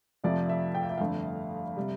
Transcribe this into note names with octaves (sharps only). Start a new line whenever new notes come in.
F2 C3 F3 A3 D5
E5
G5
F5
E5
G1 F2 D3 A3 F5
C3 G3